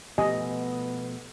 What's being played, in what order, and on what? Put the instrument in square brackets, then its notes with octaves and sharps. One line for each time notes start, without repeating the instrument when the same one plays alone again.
[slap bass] B2 F3 A3 [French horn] B3 [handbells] G4 G#5 [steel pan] D#5